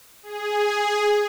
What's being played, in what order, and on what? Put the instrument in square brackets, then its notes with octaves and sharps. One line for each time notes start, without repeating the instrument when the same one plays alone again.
[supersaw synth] G#4